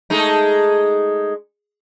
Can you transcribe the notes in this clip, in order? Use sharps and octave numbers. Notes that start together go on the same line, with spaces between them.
G#3 A3 D#4